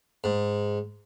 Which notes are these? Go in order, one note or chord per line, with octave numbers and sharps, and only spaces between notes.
G#2